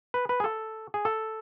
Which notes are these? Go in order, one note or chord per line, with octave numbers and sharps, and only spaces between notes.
B4
B4
G#4
A4
G#4
A4